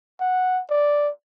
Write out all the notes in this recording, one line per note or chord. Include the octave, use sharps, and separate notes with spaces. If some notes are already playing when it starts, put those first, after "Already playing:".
F#5
D5